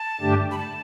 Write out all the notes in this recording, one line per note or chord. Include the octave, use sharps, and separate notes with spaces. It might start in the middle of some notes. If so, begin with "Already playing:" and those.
Already playing: A5
G2 D3 A3 D4 G4
B5
A5